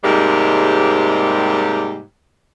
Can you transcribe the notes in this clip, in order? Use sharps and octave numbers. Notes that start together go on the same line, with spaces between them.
G#2 C3 G3 G#3 A#3 G4